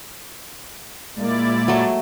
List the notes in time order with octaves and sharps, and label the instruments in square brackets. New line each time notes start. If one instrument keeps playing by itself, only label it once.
[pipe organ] A#2 E4 D5 [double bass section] G#3 A#3
[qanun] F#3 A3